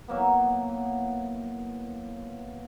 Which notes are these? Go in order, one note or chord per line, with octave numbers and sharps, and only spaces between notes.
E3 F#3 A#3 B3